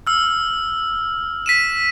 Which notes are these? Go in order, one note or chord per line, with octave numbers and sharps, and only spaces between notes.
E6 F6
B6 D#7 E7